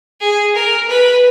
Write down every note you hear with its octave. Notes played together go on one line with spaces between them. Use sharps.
G#4
A#4
B4